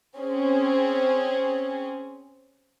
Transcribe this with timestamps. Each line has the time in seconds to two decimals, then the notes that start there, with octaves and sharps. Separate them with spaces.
0.18 C4 C#4 G#4